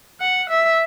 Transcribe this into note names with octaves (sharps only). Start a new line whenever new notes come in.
F#5
E5